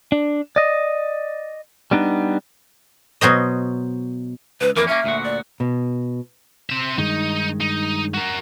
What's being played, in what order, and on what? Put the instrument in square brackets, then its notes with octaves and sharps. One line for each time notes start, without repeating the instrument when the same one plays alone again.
[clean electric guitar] D4
D5 D#5
G3 B3 D4 D#4
[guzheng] B2 F#3 C5 D#5
[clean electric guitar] C#2 [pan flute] B4
[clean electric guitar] F2 E3 A#3 [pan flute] A#4
[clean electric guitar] A#3 C#4 [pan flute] E5
[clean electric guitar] D2 A#2 F#4
[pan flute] D5
[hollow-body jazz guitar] B2
[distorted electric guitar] C4 E5
[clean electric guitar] G2 D#3 G#3 [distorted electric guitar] D#4
[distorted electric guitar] D#4
F#4 A#4